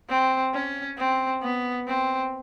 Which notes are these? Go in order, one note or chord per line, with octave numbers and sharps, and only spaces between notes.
C4
C#4
C4
B3
C4